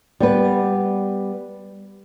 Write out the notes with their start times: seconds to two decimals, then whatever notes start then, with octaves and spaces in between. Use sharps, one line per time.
0.20 G3 B3 B4